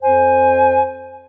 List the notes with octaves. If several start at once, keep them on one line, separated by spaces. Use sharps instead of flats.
F2 C5 G#5